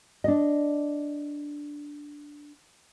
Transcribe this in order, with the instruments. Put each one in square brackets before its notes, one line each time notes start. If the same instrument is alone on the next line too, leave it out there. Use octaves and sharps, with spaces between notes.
[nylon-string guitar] D4 D#5